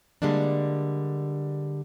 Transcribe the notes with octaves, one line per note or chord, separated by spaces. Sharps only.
D3 G3 G#3 A#3 D4